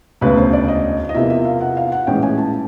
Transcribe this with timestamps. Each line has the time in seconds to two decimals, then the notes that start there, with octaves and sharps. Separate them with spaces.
0.21 E1 D2 C#3 B4
0.37 C5
0.53 D5
0.68 D#5
1.09 D#5
1.15 E2 C3 F3 A#3 E5
1.30 E5
1.45 F5
1.61 F#5
1.77 F5
1.92 F#5
2.07 A#1 A2 E3 G#3 C#4 G5
2.23 G#5
2.38 A5